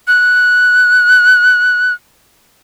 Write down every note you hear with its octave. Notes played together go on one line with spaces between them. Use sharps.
F#6